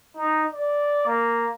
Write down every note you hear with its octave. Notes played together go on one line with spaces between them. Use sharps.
D#4
D5
A#3